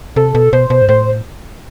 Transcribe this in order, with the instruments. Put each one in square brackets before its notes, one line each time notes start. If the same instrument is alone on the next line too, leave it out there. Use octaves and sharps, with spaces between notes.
[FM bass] C3 [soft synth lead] A4
[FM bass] B2
[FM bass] B2 [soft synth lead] C5
[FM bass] B2
G#2
[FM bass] A2 [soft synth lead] C5